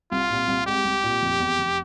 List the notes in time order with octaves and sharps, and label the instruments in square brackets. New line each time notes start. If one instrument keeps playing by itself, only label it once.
[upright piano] C2 [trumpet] F4
[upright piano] A#2
C2
[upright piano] G#3 [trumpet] G4
[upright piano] C2
A#2
F1
E2
F1